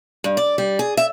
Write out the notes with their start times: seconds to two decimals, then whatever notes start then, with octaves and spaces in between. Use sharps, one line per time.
0.24 G2
0.37 D5
0.58 G3
0.79 G#4
0.97 E5